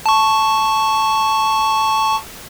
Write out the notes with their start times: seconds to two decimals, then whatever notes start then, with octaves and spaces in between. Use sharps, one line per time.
0.06 A5 C#6